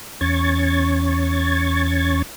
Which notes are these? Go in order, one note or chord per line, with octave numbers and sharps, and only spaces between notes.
E2 C#4 C#6 G#6 A6